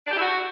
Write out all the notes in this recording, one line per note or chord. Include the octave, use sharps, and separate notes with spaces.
D4
G4
E4
F#4